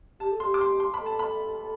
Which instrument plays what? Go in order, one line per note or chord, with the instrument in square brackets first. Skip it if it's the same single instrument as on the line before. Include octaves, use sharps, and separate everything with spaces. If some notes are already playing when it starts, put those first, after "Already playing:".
[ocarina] G4 [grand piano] A5
[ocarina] A4
[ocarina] G4 [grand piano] C6
[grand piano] D6
C6
C6
B5
[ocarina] A4
[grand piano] A5
B5